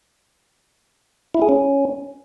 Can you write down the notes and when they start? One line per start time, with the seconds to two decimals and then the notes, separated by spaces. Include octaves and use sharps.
1.34 E4
1.42 G#4
1.49 C#4